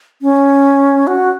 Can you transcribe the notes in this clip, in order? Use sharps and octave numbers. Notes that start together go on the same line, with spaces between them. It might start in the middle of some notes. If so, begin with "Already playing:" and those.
C#4
F#4